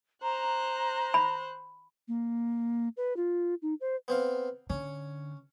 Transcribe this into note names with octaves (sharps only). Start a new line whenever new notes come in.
C5 A#5 F#6
B5
A#3
B4
F4
D#4
C5
B3 C4 F5
D3 C#4